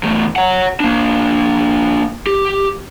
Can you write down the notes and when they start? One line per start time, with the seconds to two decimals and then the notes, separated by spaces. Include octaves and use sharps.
0.03 E2 A3
0.36 C#5 F#5
0.80 A#3 D4
2.27 G4